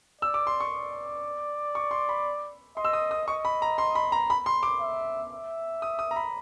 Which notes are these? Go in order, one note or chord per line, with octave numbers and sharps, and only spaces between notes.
D5 E6
D6
C6
C#6
D5
C#6
C6
B5
D#5 C6
E6
D#6
D#6
D#5 C#6
B5
A#5
C6
B5
A#5
B5
C6
D6
E5
E5
D#6
D#6
A#5
B5